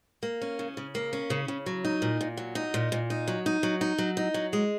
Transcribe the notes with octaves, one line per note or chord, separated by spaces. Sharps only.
A#3
C#4
C#3
C#3
A#3
C#4
C#3
C#3
F#3
D#4
A#2
A#2
F#3
D#4
A#2
A#2
D#4
F#3
D#4
F#3
D#4
F#3
D#4
F#3
G#3